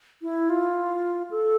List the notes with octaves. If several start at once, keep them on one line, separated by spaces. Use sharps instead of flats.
E4
F4
A4